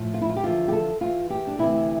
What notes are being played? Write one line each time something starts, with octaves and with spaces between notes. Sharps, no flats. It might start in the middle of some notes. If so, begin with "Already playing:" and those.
Already playing: A2 F3
F4
E4
F4
G4
E2 D3 F3 F4
G4
A4
E2 E3 F4
G4
D4
D2 C3 E3 E4